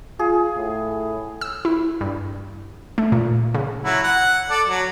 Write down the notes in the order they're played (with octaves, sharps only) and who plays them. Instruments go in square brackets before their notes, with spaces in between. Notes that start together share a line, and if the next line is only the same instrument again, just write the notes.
[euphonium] F4 [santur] G#4
[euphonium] A2
[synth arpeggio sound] E6
E4
G2
A3
A#2
C#3
[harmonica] F#3 E4 F#4
F#5
A4 D5
F#3